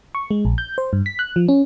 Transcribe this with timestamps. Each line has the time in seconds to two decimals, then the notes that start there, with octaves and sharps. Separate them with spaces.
0.15 C#6
0.31 G#3
0.45 A#1
0.58 G6
0.78 C5
0.93 G2
1.06 B6
1.19 F#6
1.36 F3
1.48 C#4